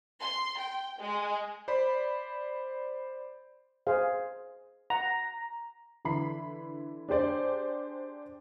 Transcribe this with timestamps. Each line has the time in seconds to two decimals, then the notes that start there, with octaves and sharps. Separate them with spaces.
0.19 C6
0.57 G5
1.00 G#3
1.68 C5 D5 B5
3.87 G#4 C5 F5
4.90 F#5 A#5
6.05 D3 E3 B5 C7
7.09 D4 G4 G#4 C5 D5